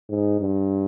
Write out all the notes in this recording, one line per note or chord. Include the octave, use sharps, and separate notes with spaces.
G#2
G2